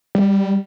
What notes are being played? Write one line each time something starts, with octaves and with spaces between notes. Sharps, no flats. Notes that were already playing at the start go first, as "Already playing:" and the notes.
G3